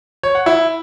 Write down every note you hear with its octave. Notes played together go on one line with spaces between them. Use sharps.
C#5
F#5
E4